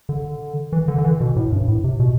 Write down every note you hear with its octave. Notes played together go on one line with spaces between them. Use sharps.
D3
E3
D3
D3
E3
B2
A2
G2
A2
C3
B2